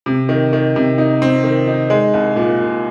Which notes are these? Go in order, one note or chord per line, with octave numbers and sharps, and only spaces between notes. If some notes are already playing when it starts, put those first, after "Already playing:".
C3
D#3
D#3
C3
D#4
C4
D#3
D#4
G#3
C2
A#2
A#2